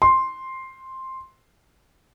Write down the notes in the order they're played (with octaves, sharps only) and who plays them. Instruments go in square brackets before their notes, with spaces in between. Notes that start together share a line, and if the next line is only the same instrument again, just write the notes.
[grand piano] C6